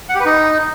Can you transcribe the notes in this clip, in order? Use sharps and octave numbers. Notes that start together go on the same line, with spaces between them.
F#5
G4
B4
D#4